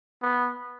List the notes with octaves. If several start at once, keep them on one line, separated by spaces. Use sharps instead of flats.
B3